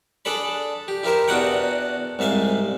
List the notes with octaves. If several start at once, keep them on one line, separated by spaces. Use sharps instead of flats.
D4 G#4 A4 D5 B5
G4
E4 G4 A#4 C5 E5
E2 D4 F#4 D#5 F#5 G5
C2 G#2 E5 F5 G#5